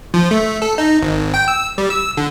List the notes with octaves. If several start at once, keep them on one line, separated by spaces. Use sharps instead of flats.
F3
A3
A4
D#4
G#1
G5
E6
G3
E6
D3